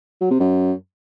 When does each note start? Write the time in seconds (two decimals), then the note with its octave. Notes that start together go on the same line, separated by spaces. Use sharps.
0.21 F#3
0.31 C3
0.40 F#2